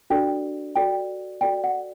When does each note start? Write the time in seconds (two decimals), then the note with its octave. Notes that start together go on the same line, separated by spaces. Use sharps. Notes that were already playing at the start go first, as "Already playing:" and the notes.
0.10 D4 F#4 A4 D5 G5
0.76 F#4 A4 D5 G5
1.41 F#4 A4 D5 G5
1.64 F#5